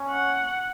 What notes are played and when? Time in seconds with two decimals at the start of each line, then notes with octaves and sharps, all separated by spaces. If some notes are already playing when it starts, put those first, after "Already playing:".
Already playing: C#4
0.10 F#5